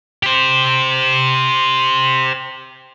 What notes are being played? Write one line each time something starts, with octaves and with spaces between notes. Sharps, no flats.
G4 C5